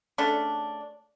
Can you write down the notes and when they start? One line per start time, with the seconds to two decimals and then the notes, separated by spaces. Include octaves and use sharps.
0.18 C#3 A3 C#4 D4